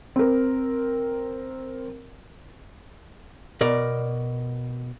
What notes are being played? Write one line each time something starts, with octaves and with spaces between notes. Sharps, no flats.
C4 A#4
B2 A#4 D5